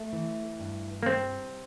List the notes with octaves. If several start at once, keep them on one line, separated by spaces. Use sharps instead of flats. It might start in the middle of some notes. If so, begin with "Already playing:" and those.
Already playing: A3
E3
G2
A#3
C3 C4